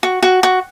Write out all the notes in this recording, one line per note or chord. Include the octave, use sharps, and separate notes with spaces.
F#4
F#4
F#4